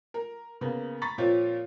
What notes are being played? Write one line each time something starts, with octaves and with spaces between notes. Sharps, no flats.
A#4
C#3 A#3 B3
A#5 B5 C#6 A6 B6
A#2 F3 C4 F4 C#5